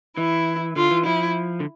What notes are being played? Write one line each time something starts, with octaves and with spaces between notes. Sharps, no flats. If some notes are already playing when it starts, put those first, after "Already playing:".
E3 E4
D3 F4
E3
F3 E4
D3